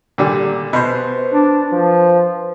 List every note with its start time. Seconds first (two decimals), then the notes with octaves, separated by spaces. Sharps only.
0.18 A#2 D3 G3
0.73 B2 B4 C5
1.32 D4
1.72 F3